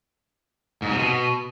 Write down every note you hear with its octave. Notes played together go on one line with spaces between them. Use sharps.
G#2
C3
B2